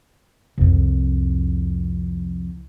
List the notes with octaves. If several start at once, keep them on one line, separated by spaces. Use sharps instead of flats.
C2 F2